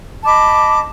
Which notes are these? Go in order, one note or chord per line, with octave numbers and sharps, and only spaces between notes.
D#5 A5 B5 D6